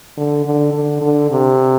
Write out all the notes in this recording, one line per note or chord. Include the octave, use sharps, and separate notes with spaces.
D3
D3
D3
D3
C3